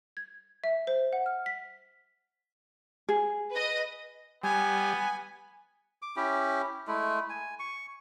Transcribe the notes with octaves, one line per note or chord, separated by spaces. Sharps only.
G#6
E5
C5
F#5
F6
B6
G#4
B4 D#5
G3 B3 G#5
D6
C#4 E4 G4
G#3 A3 E4
G#5
C#6